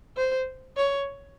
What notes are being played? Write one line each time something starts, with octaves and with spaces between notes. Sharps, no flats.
C5
C#5